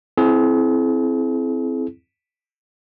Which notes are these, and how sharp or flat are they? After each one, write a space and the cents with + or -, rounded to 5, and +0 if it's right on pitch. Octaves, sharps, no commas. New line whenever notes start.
C4 +0 E4 +0 G#4 +45